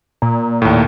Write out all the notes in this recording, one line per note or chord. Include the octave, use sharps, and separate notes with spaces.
A#2
D#2 A2